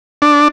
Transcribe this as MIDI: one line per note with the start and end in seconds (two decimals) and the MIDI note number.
0.22 0.48 62